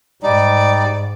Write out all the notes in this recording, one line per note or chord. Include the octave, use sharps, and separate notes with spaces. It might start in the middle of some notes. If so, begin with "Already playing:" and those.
G#2 G3 D#4 D5